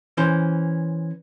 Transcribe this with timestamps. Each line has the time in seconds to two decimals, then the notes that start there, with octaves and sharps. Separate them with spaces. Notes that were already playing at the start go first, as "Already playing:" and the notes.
0.17 E3 C#4 C5